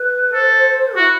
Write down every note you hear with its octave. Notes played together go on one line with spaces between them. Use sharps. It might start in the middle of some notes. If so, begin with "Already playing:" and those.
Already playing: B4
A4 C5
E4 F#4